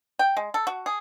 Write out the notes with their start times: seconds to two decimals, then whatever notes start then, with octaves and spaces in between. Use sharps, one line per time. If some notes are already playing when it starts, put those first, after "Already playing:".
0.19 G5
0.37 G#3
0.54 A4
0.67 F#4
0.86 G#4